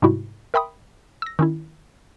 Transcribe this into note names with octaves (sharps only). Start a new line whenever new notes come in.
G#2 C3 G3 E4 F#4
A#4 E5 G5 B5 C6 D#6
E6 A#6
D#3 C#4 E4